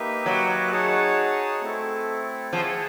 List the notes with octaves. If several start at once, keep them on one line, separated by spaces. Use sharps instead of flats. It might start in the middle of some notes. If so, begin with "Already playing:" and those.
Already playing: A#3 D#4 G4 B4 E5
F#3
D#4 G#4 C#5 F#5 A5
A3 C4 E4 A4
F3 E4 G#4 C#5 F#5 A5